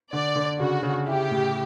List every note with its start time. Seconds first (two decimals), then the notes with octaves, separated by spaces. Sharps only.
0.13 D3 D5
0.36 D3
0.59 C#3 F#4
0.83 C#3
1.06 E4 G4
1.31 A2